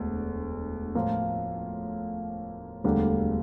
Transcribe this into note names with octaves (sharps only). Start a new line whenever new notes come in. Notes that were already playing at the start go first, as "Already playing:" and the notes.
Already playing: E1 D2
A2 F3 A#3 F4
E1 D2 D3 G3 A#3